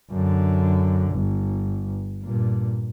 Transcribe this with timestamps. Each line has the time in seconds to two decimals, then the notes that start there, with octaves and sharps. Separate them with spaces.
0.10 F#2 D3
1.11 G1
2.23 G2 A#2